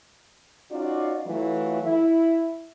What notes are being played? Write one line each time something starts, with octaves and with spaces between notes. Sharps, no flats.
C#4 D#4 F4 F#4 D5
E3 F#3 A3 E4 F4
E4